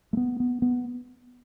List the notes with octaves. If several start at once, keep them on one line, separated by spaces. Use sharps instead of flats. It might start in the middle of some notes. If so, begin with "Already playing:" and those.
A3
B3
B3
B3